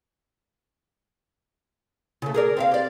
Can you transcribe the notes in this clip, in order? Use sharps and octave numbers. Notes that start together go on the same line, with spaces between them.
C#3 A3
G#4 A#4 D5
C4 E5 F5
G4 D5